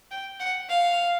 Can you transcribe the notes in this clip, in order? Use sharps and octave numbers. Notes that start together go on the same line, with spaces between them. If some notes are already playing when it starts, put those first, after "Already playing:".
G5
F#5
F5